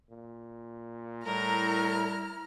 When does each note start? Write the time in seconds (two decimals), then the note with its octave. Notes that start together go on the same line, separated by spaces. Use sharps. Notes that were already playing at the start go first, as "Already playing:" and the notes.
0.10 A#2
1.26 A2 G3 E4 A#4 A#5 F6